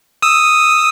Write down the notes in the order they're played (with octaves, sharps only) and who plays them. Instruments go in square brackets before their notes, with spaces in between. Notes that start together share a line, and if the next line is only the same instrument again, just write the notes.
[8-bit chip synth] D#6 E6